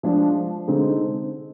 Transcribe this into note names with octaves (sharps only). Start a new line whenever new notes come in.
F3 G#3 D4 G#4
D3 G#3 C4 D#4